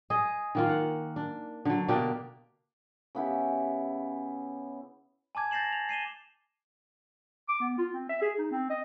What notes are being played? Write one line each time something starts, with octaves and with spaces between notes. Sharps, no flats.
G#4 D#5
D#3 A#3 F4
F#5
D4
D3 F#3
B2 A#3 D4 G4
C#3 B3 E4 G4
G#5 A5 D6 G#6
G6 A6 A#6 C7 E7 F#7
F7
C7 D#7 E7 G7
D6
B3
F4
C4
E5
G#4
D#4
C4
D#5